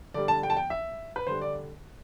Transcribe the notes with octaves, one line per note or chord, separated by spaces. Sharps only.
D3 G3 D5
A5
G5
A5
G5
E5
B4
D3 G3 C5
D5